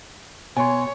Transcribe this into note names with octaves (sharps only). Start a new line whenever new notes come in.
B2 C#5 G#5 C6